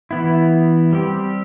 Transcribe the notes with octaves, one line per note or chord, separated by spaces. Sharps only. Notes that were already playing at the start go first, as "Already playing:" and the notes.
E3 B3 E4
G3 C4 G4